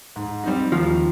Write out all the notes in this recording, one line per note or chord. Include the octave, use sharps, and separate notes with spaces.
G#2
G3 C4 D#4
D#2 F3